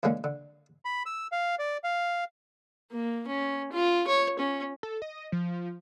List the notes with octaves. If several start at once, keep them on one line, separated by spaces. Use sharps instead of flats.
F#2 D3 G#3 A#3 C#4
D3
B5
E6
F5
D5
F5
A#3
C#4
F4
C#5
C#4
A4
D#5
F3